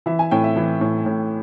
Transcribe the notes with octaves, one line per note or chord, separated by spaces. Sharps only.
E3 E5
G#5
A2 G5
E5
E3
A2
A2